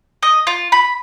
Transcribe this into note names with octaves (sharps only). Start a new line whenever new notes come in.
D#5
F4
B5